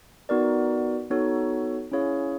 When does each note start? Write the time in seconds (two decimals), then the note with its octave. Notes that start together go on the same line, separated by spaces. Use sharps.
0.29 B3 D#4 F#4 A#4 D5
1.10 B3 D#4 F#4 A4 C#5
1.92 C#4 E4 G#4 C#5 F5